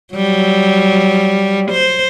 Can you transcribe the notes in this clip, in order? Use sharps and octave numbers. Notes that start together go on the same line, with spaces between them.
F#3 G3
C5